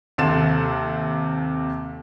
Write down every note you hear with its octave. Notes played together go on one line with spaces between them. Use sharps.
D#2 C3 A4 C6 A6 E7